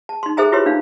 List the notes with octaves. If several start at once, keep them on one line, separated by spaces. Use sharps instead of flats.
A5
D#4 C6
G#4 A4 C5 E5 G#5 A#5
E4 F4 G4 B4 C#5 C6
D4 D#4 F5